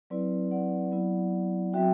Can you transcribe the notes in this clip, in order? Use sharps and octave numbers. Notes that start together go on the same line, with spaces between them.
F#3 C4 E4 B4 D5
D5 F#5
F#3 B3 E4
F#3 C4 F#4 E5 G5